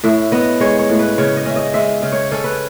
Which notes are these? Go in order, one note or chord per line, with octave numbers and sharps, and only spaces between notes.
A2 E5
B3 D#5
G#3 C#5
C#5
A2
B4
C#3 C#5
D#5
C#4 E5
D#5
G#3 E5
C#3
C#5
C#4 A4
B4